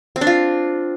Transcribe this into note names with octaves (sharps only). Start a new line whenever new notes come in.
C4
D4
F4